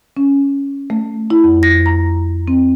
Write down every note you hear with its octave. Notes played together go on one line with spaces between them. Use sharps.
C#4
A3
E4
F2
A#6
A#5
C4